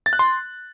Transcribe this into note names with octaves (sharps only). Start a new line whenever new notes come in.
A6
F#6
C6